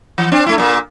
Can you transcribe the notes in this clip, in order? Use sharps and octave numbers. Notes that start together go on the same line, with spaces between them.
E3
C4 D4
A3 E4
A#2 A#3